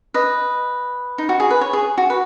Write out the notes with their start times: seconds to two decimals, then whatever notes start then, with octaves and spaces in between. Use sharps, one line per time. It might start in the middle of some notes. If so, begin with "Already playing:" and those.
0.14 B4 D#5
1.18 D#4
1.29 F#4
1.40 G#4
1.50 B4
1.61 C#5
1.73 G#4
1.98 F#4
2.10 B4